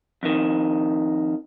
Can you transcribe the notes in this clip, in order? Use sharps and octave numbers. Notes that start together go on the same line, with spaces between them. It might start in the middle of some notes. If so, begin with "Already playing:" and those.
F2 D#3